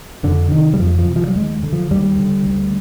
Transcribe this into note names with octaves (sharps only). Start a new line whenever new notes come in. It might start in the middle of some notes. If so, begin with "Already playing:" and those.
F2 D3
C3 D#3
G3
F2 F3
F3
C3
F3
G3
D#2 G#3
D3
F3
D#2 G3
D3
D2